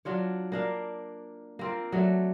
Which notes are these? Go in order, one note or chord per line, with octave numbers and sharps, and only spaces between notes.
F#3 D4 F4 C#5
A#3 D4 F5
A#3 C4 F4
F#3 A3 D4